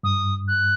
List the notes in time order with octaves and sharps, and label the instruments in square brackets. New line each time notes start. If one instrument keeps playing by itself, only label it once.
[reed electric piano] G2 [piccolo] D#6
[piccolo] F#6